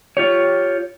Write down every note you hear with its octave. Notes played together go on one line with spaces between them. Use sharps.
F4 G4 C#5